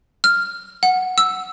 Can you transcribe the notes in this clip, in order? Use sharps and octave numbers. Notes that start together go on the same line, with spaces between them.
F6
F#5
E6